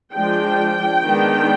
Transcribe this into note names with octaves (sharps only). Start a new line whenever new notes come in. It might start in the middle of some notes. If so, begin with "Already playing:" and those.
F3 G#3 D4 G5
D#3 G#3 B3 D4